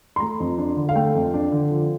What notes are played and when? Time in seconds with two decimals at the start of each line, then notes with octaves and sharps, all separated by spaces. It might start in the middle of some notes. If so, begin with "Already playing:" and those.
0.16 C6
0.20 A3 A#5
0.40 F2
0.58 D4
0.77 D3
0.89 F5
0.95 A3 G5
1.15 F2
1.34 D4
1.52 D3
1.71 F3